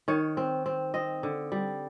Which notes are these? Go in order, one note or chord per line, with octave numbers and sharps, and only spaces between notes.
D#3 C#5
C4
C4
C4 D#5
D3
G3